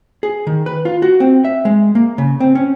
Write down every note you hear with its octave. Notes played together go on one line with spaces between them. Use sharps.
G#4
D#3
B4
F4
F#4
C4
E5
G#3
A#3
C#3
C4
C#4